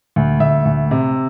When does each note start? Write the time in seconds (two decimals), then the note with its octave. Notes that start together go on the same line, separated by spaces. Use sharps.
0.16 D2
0.40 D2 E5
0.65 D2
0.91 C3